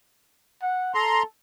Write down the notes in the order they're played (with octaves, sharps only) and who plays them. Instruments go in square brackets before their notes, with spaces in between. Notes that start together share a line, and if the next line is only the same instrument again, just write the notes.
[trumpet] F#5
[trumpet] A4 [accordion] A#5 C6